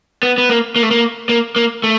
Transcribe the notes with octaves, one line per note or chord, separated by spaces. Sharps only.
B3
B3
A#3
A#3
A3
A#3
A#3
A#3
A3